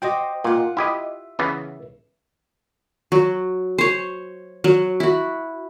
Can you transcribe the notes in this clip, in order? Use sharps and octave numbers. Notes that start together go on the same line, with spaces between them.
F#4 C5 D#5 G5 D6
A#2 F4 F#5
E4 G4 D#5 E5
C#3 E3 B3
F#3
C5 C#5
F#3
E4 F#4